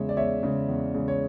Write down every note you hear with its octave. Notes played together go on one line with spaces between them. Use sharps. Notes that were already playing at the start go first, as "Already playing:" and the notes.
Already playing: E2 C#3 G#3 C#5 E5
D5
E2 C#5 E5
C#3 G#3
E2
C#3 G#3
C#5